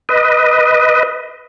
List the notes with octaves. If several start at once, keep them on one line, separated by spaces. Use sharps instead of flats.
B4 D#5